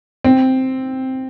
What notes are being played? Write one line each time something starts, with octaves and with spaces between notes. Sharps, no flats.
C4